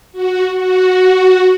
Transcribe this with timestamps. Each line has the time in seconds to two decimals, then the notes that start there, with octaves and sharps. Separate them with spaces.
0.12 F#4
0.57 F#4